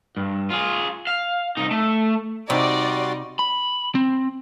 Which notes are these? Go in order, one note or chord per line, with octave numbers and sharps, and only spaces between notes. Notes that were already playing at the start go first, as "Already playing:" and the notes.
G2
F4 G#4
F5
C2 D#4
A3
C3 G3 D#4 F#4 D5 C6
B5
C4